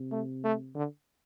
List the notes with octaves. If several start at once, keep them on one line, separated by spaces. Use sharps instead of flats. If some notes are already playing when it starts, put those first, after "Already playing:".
Already playing: C3
A3
A3
D3